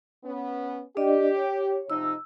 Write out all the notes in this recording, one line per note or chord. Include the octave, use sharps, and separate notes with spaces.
B3 C#4
D4 G4 D5 D#5
C#5
C3 F3 D#4 E6